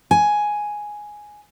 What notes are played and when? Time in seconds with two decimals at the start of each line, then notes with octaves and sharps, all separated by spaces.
0.11 G#5